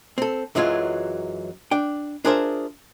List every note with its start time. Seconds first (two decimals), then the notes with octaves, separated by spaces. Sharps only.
0.18 C4 A4
0.55 F#2 E3 F#3 G#3 F4
1.71 D4 G5
2.25 D4 F4 G#4 A#4 C5 E5